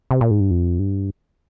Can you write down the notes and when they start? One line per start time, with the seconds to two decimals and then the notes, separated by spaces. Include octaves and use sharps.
0.11 C3
0.21 A#2
0.31 G#2
0.40 G2
0.51 F2
0.79 G2